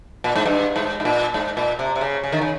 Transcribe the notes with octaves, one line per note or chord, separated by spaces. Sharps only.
A#2
G#2
G2
G#2
G#2
A#2
G#2
A#2
C3
C3
C#3
C#3
D#3
C#3